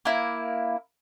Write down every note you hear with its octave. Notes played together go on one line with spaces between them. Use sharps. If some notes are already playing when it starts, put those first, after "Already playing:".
A#3 E4